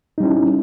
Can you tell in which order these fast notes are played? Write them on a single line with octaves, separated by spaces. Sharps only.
D#4 G3 C#4 E4